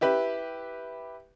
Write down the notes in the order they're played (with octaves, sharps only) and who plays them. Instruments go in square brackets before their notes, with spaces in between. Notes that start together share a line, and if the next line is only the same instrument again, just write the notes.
[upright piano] E4 G4 B4